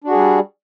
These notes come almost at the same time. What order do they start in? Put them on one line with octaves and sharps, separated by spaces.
D4 F#4 G#4 G3